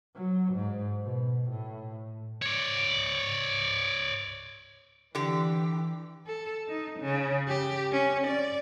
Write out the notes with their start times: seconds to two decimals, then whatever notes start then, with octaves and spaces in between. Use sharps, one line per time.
0.15 F#3
0.54 G#2
1.03 B2
1.50 A2
2.42 C#5 D5
5.15 D3 E3 G4
6.26 A4
6.68 D#4
7.00 C#3
7.48 G4
7.92 C#4
8.27 D5